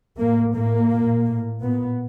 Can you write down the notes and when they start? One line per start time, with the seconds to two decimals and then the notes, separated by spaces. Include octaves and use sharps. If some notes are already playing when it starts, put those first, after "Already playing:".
0.19 A2 A#3
0.54 A2 A#3
0.90 A#2
1.26 A2
1.62 A#2 B3